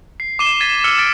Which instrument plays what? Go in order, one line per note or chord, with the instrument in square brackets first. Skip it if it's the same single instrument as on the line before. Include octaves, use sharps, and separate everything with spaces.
[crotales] C7
D6 C7 D#7 E7 G7
G#6 A6 B6 D#7
E6 F6 C#7 F#7
F6 A6 B6 D7